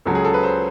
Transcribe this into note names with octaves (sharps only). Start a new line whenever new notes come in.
C#2 C#3 F#3 A4
G#4
A4
B4
C5